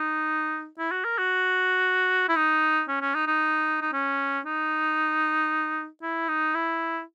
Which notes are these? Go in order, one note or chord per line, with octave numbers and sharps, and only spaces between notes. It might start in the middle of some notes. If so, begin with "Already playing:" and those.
Already playing: D#4
E4
F#4
A#4
F#4
E4
D#4
C#4
C#4
D#4
D#4
D#4
C#4
D#4
E4
D#4
E4